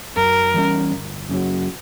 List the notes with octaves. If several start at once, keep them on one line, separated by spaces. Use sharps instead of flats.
F#2 A#4
E3 G3 C#4
G1
F#2 C#3 F#3